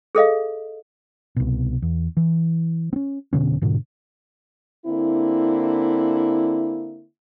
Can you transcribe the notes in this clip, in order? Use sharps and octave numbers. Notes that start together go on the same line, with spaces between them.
G#4 A4 D#5 F5
C2 B2
E2
E3
C4 C#4
F1 B2 D3 C#4
G#2 B2 D3
D3 A#3 C4 E4